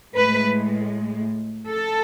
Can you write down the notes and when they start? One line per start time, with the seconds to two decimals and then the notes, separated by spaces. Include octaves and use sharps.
0.14 A2 G#3 B4
1.67 A4